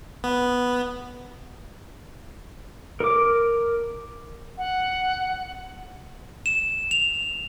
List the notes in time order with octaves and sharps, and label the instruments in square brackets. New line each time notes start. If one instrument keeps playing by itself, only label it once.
[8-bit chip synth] B3
[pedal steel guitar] A#4 D6
[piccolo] F#5
[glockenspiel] E7
F7